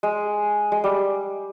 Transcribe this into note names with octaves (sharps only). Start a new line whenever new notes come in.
G#3
G#3
G3